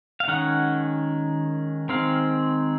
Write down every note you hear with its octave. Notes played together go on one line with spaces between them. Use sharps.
F5
D#3 G#3 C#4 F#5
D#3 G#3 C4 F5